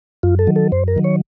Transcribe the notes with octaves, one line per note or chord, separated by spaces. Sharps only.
F#2 F4
A4
D#3 F#3
A4
F#2 C5
A#4
D#3 F#3
C#5